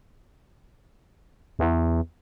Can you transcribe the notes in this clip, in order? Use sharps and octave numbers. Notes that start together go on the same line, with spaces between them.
E2